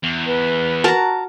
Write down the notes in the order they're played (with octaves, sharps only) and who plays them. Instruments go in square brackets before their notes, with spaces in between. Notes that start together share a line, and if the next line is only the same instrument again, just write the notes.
[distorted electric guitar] E2
[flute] B4
[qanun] F#4 A#4 [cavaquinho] A5 A#5